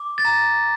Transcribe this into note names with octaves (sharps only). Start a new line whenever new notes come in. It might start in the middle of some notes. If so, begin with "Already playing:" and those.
Already playing: D6
A6
A#5 A#6